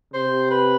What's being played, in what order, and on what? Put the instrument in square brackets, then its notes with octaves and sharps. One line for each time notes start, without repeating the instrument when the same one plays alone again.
[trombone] C3 [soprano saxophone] C5
[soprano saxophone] B4